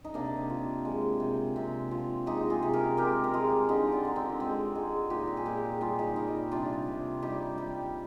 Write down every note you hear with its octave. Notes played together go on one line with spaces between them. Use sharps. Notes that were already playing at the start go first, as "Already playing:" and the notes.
D#4
C3 A#3 D4
F3
G#3
C3
C3
F3
G#3 D#4 G4
F4 G#4
C3
G4 A#4
G#3 G4 A#4
A#4
G#3 F4 G#4
D3 D#4 G4
D4 F4
D3
C4 D#4
G#3 C4
G#3
A#2 D#4 G4
G4
G#4
A#2 G4 A#4
G3 F4 G#4
D#4 G4
G3 D#4 G4
C3 D4 F4
C3
G3 D#4 G4
G3